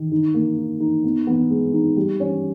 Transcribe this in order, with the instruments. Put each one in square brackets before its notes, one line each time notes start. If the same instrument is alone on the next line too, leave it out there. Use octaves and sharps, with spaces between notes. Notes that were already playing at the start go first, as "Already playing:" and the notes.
Already playing: [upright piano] D#3
D#4
A#3
D#4
D#4
B3
B3
G#3
D#4
G3
C#4